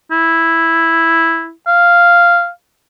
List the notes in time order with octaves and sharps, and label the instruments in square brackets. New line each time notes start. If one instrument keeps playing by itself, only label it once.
[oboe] E4
F5